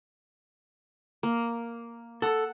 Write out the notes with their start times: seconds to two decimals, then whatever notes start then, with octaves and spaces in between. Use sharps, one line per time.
1.23 A#3
2.22 A4 F#5